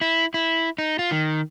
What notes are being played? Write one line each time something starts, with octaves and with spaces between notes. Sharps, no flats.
E4
E4
D#4
F4
D#3